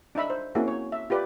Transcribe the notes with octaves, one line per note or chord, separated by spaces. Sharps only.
D4 D#4 E5 B5
C5
A#3 C4 C#4 E4 F#4 G#4
C#5
E5
F4 G4 B4 D5